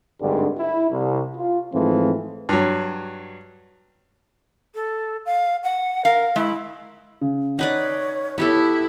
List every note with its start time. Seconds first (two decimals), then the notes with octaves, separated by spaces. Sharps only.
0.21 G#1 D2 G2 D3 D#3 G#3
0.59 E4
0.91 C2
1.35 F4
1.73 G#2 E3 F3 A3 C4
2.49 G2 F#3
4.74 A4
5.26 F5
5.63 F#5
6.05 A#4 F5
6.36 G#3 E4
7.21 C#3
7.59 D#4 B4 C#5 D5 F#5
8.38 B3 E4 G4 A4